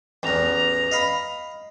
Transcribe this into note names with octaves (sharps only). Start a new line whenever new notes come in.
A1 E2 A#5
D#5 F5 B5